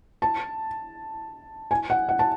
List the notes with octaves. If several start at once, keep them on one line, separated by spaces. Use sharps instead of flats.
A5
G#5
F#5
F#5
A5